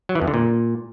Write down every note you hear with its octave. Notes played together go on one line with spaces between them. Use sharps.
F#3
E3
F2
D3
A#2